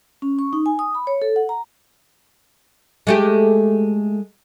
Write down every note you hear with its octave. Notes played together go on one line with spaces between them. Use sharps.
C#4
C#6
D#4
G#5
D#6
B5
C#5
A4
F#5
A#5
G#3 A3 G4